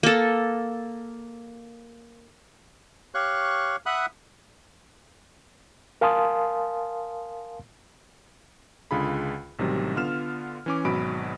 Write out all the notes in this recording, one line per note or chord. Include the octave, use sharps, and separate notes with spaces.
A#3 A4
G4 C#5 F5 C#6 F#6
E5 F#5 B5 D#6 F#6
A#4 F5 G#5 A5 C6 D#6
C#2 D3 F4 G#4 B5
A1 C3 D#3 F#3 G3
D3 B3 F4 F6 E7
E3 C#4 D6
G#1 B2 F#3 B5 D7